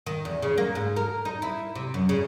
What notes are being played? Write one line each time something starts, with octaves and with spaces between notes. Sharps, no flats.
D#3
E2
C#3
A#3
G#2
A#4
D#4
E4
C3
F#2
C#3